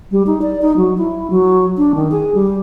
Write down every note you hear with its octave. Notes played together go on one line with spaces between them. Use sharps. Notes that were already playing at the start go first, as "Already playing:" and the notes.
G3
D#4
D5
D#4
F#3
E4
F#3
D4
D#3
G#4
G3